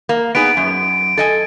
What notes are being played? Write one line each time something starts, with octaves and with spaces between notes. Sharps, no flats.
A#3
B3 D#4 G#4 D7
F#2
A4 D#5 G#5